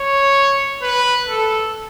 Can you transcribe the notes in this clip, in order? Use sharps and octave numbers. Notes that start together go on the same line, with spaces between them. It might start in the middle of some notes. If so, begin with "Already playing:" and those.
Already playing: C#5
B4
A4